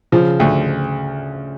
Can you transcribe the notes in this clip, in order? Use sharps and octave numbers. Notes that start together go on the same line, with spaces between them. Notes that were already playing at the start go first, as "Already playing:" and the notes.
C#3 F3
D2